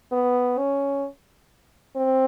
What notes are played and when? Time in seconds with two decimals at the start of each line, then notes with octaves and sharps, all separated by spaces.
0.12 B3
0.58 C#4
1.97 C4